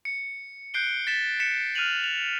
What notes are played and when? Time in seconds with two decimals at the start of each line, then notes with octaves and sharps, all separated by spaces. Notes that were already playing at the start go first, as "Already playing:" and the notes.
0.05 C#7
0.74 F#6 G6 C7 D7 G7
1.07 A6 B6 E7
1.40 B6 C#7 E7
1.75 F6 F#6 D#7 F7 F#7
2.04 F7